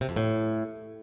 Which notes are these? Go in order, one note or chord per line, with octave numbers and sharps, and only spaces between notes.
C3
F2
A2